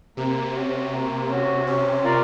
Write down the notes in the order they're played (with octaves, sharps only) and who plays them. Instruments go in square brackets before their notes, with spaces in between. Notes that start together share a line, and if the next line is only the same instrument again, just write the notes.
[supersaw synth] C3 [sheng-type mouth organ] A#3
[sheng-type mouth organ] C#4 F#4
A#3
C#4 F#4
[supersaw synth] C3 [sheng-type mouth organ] C#4
[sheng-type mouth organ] F4 A#4 D5